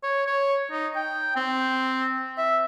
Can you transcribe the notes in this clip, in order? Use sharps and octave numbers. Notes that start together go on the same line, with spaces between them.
C#5
C#5
D#4
G5
C4
E5